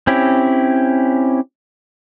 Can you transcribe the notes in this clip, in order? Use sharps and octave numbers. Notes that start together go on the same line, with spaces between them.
C4 C#4 E4 G4